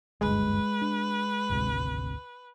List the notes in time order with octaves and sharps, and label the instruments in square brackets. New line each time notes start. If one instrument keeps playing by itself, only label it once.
[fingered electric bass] F#1 D2 G2 [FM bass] G#3 [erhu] B4
[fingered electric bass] D4
G#1 D2 C3